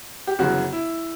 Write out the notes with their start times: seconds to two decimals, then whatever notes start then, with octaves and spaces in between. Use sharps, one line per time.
0.27 G4
0.39 G1 F#2 C#3 E3 F#4
0.72 E4